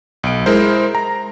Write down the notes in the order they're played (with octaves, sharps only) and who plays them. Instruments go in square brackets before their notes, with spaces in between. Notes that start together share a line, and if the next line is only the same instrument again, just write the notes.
[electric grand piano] B1 D7
G#3 E4 A#4 C5
A#5